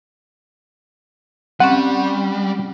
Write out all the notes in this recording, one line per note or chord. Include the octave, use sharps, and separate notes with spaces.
G3 C4 C#4 F#5